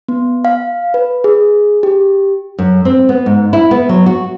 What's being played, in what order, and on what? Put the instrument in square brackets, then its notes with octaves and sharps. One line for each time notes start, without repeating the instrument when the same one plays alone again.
[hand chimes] B3
F5
B4
G#4
G4
[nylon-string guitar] F#2
C4
B3
G#2
E4
B3
F#3
F#4